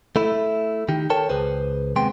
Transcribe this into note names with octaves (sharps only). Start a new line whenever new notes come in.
A3 E4
D#3 G4
A4 A#4 C#5 G5 A5
C#2 G#4 B4 C5
D#2 C3 G#3 B3 G5 C6